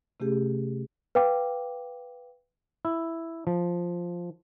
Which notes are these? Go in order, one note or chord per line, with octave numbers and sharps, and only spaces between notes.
C3 A3 C#4 G4 G#4
B4 F5 G5 D6
E4
F3